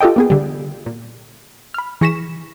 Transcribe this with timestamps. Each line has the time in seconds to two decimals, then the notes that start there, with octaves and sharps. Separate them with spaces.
0.01 F4 G4 A4 D#5 G5
0.16 A#3 B3 G#4
0.30 D3 G3
0.86 A#2
1.74 B5 F6
2.01 E3 G#4 C#6 A#6 B6 E7